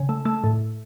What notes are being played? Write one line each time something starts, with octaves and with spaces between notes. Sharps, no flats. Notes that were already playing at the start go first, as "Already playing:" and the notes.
Already playing: C#3
A3
A3
A2